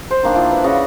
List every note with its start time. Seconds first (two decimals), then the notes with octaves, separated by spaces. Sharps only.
0.10 C5
0.23 D#3 A#3 D4
0.34 F3 E4
0.51 B4
0.64 C#3 D4 F#4 D#5